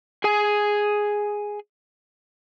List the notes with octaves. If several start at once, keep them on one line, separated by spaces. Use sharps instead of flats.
G#4 G#5